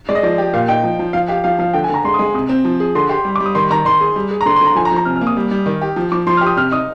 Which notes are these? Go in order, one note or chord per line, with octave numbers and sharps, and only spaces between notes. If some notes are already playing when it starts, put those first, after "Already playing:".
G#3 D5
D#5
F3 D5
G4
A#2 F5
D#4 G5
F3
F3
F3 F5
G4 F5
F3 F5
F3 F5
D3 G5
G#5
D3 A#5
G#3 C6
D#6
G#3
C3 D#6
C4
F3
G#4
D3 C6
G4 C6
G3
D6
G3
D#6
D#3 C6
D#3 A#5
D#3 C6
G#4
G3
G#4
A#5
D3 C6
C6
D3 A#5
F3 G#5
A#5
F3
A#5
C3 F6
F6
A#3
D#6
G3
G3
D#3
G4
F3
F3 D6
F3 C6
F6
G4
D#6
C3 F6
D#4 D#6